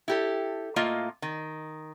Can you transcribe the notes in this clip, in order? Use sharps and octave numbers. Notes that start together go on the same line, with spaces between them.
E4 G4 A4
A2 A#3 F4 D#5
D#3